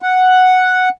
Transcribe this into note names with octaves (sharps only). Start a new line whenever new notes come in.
F#5